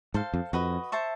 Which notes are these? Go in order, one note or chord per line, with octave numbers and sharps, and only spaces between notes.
G#2 A4 C5 F5
F2
F2 F#4 B4 D#5
C5 E5 A5 C#6